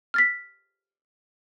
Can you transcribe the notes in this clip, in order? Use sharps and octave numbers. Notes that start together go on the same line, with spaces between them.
F6 A6 B6